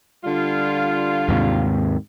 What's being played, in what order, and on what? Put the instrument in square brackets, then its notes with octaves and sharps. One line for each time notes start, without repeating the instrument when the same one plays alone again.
[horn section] D3 G3 F4
[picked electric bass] D#2 G#2 C3